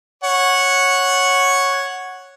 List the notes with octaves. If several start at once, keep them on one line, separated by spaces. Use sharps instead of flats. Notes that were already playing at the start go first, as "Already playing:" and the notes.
C#5 F#5